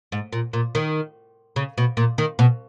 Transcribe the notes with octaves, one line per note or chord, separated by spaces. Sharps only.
G#2
A#2
A#2
D#3
C#3
B2
A#2
D#3
B2